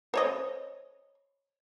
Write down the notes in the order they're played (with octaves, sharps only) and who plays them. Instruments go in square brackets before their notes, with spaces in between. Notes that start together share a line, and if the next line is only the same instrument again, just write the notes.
[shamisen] C5 C#5 D#5